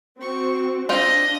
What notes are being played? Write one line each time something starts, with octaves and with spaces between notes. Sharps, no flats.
C4 F#4 C#6
C4 D4 F4 D#5 G5